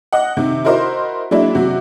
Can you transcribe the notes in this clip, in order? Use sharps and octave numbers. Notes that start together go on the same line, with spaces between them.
D#5 F#5
C3 D#3
E4 F#4 A#4 C5 D#5 C6
F#3 G#3 A#3 D4 E4
C3 F#3 F#4